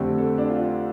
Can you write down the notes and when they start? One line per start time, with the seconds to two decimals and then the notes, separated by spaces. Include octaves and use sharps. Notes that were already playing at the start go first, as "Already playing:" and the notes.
Already playing: F2 D3 A3 C4 G4
0.18 A4
0.38 D4
0.50 F4